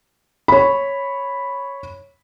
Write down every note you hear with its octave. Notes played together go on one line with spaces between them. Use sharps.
C#5 B5